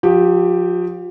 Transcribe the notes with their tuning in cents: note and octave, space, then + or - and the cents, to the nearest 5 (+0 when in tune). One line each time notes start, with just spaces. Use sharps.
F3 +35 G4 +0